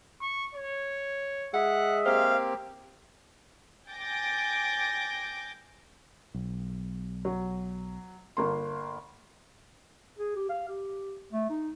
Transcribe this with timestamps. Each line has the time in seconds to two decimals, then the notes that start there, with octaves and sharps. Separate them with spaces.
0.21 C#6
0.54 C#5
1.54 G#3 D#5 E5 F#5
2.05 A#3 C4 G4 C5 F5
3.90 G5 G#5 D6 G6 A6 A#6
6.34 B1
7.25 F#3
8.37 G1 A#3 C6
10.18 G#4
10.36 G4
10.50 F5
10.68 G4
11.33 A3
11.50 D#4